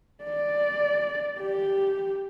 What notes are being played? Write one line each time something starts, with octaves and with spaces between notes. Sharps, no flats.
D5
G4